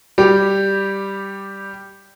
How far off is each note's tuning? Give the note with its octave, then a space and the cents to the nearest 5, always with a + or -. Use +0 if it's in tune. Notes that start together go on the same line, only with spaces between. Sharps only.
G3 +0 G4 +0